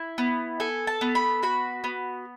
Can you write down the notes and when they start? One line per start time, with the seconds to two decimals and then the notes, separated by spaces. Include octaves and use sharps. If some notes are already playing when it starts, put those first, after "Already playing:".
Already playing: E4
0.18 B3
0.60 A4 G#5
0.87 A5
1.01 B3
1.15 B5
1.43 F#4 B5
1.84 B3